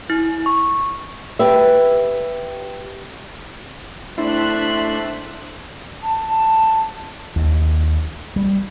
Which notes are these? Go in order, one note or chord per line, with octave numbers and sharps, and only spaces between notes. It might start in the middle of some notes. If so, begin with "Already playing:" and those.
E4
C#6
G4 B4 E5
A3 C4 D4 E4 E5 C6 F#6
A5
A5
D#2
G3